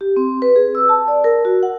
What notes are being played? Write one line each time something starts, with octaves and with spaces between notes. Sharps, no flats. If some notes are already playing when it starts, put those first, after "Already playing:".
G4
C4
B4
G#4
E6
A5
D5
A#4
F#4
F#5